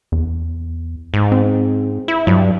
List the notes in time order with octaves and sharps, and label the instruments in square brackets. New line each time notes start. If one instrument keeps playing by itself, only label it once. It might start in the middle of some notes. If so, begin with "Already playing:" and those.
[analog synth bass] E2
[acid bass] G#2
[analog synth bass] C4
[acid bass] E4
[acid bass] G2 [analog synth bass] F#3